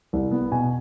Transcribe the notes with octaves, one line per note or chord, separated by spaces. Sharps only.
C2
B3
B2 G#5